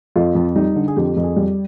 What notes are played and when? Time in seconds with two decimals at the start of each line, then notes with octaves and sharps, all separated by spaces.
0.16 F2 F4
0.35 F2
0.56 G3 D#4
0.76 D3
0.88 G#4
0.96 F2 G4
1.16 F2
1.23 G#4
1.37 G3